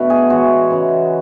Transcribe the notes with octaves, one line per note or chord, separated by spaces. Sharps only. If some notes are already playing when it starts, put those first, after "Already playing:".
Already playing: B2 A3 B3 D4 F#4 B4
G#4
A2 E3 G#3 F#4
C#3 E3 G#3 C#4